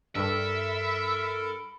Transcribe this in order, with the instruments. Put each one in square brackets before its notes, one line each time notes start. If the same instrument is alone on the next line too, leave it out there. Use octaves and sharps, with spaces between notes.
[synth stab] G2 [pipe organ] A4 A#4 [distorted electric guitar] E5 [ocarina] B5